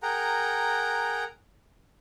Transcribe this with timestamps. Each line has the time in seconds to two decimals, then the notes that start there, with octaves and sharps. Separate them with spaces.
0.03 G#4 A#4 F#5 G5 A#5